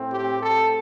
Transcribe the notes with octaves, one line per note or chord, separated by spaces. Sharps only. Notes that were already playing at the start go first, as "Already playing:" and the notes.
Already playing: A2 A3 C4
G4
A4